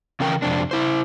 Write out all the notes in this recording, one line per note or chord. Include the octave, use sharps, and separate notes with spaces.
C#3 E3 C#4 A#4 G5
F2 C3 C4 D4
E4 C5